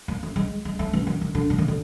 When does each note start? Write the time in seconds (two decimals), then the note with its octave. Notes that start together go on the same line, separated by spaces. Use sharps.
0.08 A#3
0.23 A3
0.36 G#3
0.65 G#3
0.79 A3
0.93 E3
1.07 D#3
1.21 D#3
1.35 D3
1.50 D3
1.58 D#3
1.68 D3